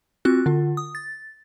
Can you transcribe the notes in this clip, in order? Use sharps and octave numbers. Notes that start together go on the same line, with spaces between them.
C4 F4 F#4 F#6
D3 F4
D#6
A6